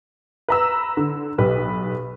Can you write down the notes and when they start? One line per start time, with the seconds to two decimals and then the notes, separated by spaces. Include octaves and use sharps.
0.49 B4 A#5 E6
0.97 D3
1.38 B1 G4 B4